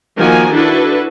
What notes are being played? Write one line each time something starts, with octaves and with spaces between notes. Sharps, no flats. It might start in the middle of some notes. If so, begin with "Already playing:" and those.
D#3 F3 A#3 F#4 A#4 G#5
D4 E4 F#4 A4 B4